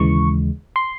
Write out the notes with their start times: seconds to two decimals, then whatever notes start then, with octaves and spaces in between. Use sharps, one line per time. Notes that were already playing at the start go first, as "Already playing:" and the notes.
Already playing: D#2 C#3 E3 G#3 C#6
0.76 C6